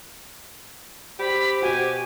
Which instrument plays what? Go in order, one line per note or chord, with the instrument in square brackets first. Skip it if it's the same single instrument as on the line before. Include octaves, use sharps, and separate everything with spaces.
[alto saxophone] G4 [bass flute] C5 [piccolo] B5
[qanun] B2 F#4 [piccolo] G#5